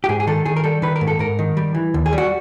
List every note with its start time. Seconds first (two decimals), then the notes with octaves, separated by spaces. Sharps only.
0.04 G4
0.09 G#2 G#4
0.20 G#4
0.27 D#3 A4
0.45 D#3 G#4
0.56 A#4
0.64 G3 A4
0.82 D#3 B4
0.96 A#4
1.01 G#2
1.08 A4
1.19 G#2 A#4
1.39 D#3
1.57 G3
1.75 E3
1.94 D#2
2.06 G#4
2.13 G3
2.18 F#4